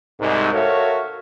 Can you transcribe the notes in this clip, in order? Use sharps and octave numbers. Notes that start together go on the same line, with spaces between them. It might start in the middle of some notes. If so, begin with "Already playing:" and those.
C2 G#2
F#4 A4 A#4 C#5 E5 F5